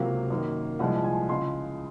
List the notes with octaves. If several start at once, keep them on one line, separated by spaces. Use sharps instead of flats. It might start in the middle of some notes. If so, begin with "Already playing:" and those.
Already playing: C#2 C3 F#3 A#3 F5
F#2 D#3 A#3
C2 A#2 F3 G#3 F#5
G#5
C#2 C#3 G#3 C6